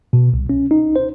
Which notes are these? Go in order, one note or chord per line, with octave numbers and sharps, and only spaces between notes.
B2
C2
C#4
D#4
C5